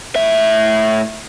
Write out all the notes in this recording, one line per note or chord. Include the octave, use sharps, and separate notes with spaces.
A2 E5